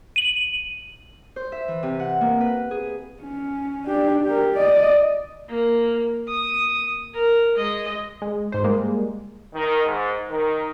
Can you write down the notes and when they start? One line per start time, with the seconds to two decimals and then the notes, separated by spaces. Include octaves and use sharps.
0.16 D#7 F#7
1.36 C5
1.52 E5
1.68 E3
1.83 C3
2.00 F#5
2.21 A#3
2.41 B4
2.71 G#4
3.23 C#4
3.87 D4 G4
4.25 G4 A#4
4.54 D5 D#5
5.49 A#3
6.28 D#6
7.15 A#4
7.56 G#3 D#5
8.22 G#3
8.52 G#2 C5
8.64 G3 G#3 A#3
9.54 D#3
9.85 G#2
10.29 D#3